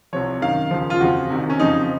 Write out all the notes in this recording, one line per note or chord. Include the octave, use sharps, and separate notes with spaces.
C2 C3 F3 C#5
F#2 D#3 F5
D#2 C#3 F3
F4
F2 C#3 F3 F#4
C2 C3 D#3
C#4
F2 C#3 F3 D#4